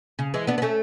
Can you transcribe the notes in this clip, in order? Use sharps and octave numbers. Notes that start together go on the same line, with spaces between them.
C#3
E3 G#3
B3 D4
B3
A3 C#4